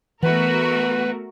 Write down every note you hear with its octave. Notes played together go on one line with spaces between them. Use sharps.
E3 A3 B3 F#4 A#4 B4 F#5